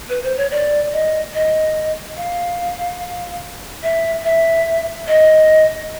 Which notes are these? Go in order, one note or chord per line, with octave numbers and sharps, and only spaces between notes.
B4
C5
C#5
D5
D#5
D#5
F5
E5
E5
D#5